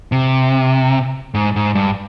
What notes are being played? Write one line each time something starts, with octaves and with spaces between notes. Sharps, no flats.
C3
G#2
G#2
G2